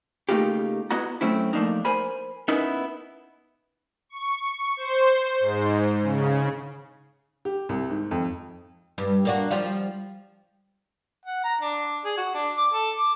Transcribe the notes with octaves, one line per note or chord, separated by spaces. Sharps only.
C#3 A3 A#3 D#4 F4 G4
B3 E4 F#4 D#5 F#5 A#5
F#3 A3 C4 C#4 E4
F3 A3 A#3 D4 D#4
A#4 C5 G#5 B5
B3 C#4 D#4 E4 A#4 B4
C#6
C5
G#2
C#3
G4
C2
G#2
F2
G2
A#3 D4 F#4
F3 G3 F4
F#5
A#5
D4
G#4
F#4
D4
D6
A4
D6